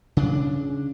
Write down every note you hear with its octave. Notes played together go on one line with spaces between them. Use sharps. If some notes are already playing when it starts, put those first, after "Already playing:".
C#3 D4